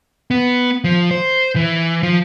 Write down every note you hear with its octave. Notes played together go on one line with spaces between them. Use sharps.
B3
F3
C5
E3
F3